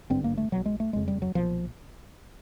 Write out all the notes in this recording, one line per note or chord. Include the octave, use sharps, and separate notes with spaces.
G#1 G2 D3 C4
A#3
A3
B1 B2 F#3
G#3
A3
F#1 F2 C#3 G#3
G3
F#3
B1 A#2 F3